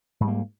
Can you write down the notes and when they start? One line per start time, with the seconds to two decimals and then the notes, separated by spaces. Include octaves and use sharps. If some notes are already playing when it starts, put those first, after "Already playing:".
0.20 G#2
0.24 G3
0.28 A#3